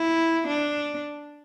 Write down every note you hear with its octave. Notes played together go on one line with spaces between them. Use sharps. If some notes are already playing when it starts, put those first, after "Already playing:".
Already playing: E4
D4